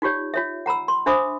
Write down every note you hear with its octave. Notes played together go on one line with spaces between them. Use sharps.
D#4 F4 G4 C#5 D5
F4 C#5 E5
F#5 A#5 B5 E6
C6
D4 C5 E5 B5 D6 D#6